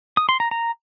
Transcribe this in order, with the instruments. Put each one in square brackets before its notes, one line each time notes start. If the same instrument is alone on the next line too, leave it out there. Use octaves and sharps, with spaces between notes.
[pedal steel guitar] D#6
C6
A#5
A#5